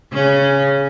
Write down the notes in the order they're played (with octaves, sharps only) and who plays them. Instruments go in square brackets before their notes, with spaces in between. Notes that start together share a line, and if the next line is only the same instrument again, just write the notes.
[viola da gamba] C#3 C#4